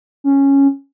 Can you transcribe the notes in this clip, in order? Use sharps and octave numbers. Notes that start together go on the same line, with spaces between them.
C#4